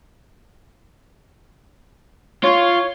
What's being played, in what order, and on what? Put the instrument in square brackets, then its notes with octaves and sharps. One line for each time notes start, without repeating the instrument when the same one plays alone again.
[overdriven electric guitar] F4 [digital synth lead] C#5